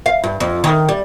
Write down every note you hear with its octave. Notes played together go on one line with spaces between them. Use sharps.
F5
G2
F2
D#3
G3